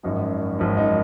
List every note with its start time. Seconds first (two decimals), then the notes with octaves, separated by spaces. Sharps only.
0.03 G#1 F#2 F3 D#4
0.59 G#1 F#2 F3 C#4
0.77 D#4